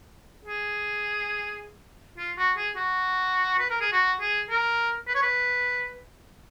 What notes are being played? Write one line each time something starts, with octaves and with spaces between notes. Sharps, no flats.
G#4
F4
F#4
G#4
F#4
B4
A#4
G#4
F#4
G#4
A#4
B4
C#5
B4